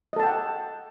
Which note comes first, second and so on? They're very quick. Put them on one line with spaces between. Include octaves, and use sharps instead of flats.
D#5 A4 A5 G5 F#5